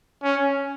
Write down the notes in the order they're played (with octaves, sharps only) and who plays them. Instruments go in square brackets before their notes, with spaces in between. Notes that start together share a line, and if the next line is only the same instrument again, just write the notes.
[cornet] C#4